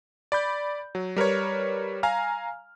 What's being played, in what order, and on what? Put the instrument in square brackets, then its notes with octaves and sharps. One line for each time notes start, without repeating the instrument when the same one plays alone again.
[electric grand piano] D5 B5 G6
F#3
G3 A#4 B4 C#5
F5 G#5 A#5 F6